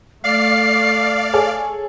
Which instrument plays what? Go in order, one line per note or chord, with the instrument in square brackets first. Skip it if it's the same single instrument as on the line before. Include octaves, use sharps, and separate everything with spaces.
[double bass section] A3 [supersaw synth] D5 F5 [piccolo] C7
[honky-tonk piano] G#4 A4 C#5